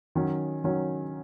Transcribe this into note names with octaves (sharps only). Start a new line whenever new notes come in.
D#3 F#3 C#4
D#3 F#3 C#4